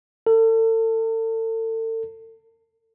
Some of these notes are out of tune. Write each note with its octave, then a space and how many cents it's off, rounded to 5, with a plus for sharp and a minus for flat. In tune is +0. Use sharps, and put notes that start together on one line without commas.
A4 +35